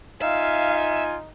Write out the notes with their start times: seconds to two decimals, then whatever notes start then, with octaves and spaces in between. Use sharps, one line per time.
0.22 D#4 F4 E5 F5 G#5